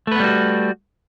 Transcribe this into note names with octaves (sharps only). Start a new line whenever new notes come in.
G3 A3 B3 F#4 B4